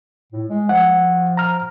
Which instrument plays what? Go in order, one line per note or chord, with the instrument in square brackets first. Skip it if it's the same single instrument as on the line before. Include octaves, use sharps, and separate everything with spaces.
[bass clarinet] A2
G#3
[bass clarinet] F3 [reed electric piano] F#5
[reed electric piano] A#5 F6